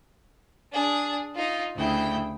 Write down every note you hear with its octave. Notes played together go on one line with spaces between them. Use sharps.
D4 G#4
D#4 F4
D2 C#3 E4 G5